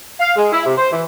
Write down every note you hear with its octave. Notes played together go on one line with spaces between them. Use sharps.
F5
G#3
E4
C3
C5
E3